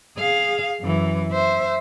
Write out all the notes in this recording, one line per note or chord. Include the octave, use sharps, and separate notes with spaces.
G#4 F5
F#2 E3
C5 E5